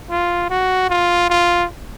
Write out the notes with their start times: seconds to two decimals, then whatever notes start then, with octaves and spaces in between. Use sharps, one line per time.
0.10 F4
0.50 F#4
0.89 F4
1.30 F4